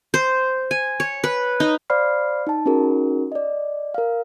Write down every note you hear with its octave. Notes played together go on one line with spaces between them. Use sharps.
C5
G#5
C#5
B4
D#4
C5 D5 F5 B5 F6 C7
D#4 A5
C#4 D#4 F#4 G#4 A#4
D5 D#5
A#4 F5